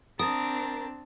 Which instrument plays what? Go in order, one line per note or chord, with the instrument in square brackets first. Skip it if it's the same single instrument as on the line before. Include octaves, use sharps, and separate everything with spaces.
[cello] C4 D4 [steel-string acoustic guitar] A#4 [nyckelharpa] A5 [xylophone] D#6